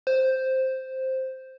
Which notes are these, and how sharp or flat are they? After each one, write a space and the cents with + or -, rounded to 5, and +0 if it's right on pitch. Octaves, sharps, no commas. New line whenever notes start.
C5 +0